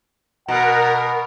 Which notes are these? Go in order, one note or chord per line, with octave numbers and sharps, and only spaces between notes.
B2 A#4 F#5 A#5